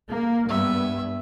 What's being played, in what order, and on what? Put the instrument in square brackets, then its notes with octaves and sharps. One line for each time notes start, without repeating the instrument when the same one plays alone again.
[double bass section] A#3
[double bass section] G2 [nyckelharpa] B3 E5